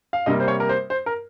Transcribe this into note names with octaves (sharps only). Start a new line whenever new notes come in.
F5
C3 G3 A#3 D#5
C5
C#5
A#4
C5
C5
A#4